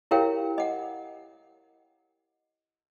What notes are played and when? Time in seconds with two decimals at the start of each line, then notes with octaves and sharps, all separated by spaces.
0.11 E4 G4 A#4 C#5 F5 G5
0.58 D#5 F#5